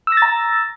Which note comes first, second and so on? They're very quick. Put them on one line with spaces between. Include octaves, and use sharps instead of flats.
E6 A#6 A6 A#5